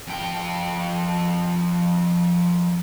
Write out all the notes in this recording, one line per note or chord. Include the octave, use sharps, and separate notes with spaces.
F2 G5